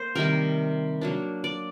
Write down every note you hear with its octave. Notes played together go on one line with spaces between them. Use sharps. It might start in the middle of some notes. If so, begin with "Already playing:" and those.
Already playing: A#3 C5
C3 D#3 G3 A#4
F#3 A#3 D4
D5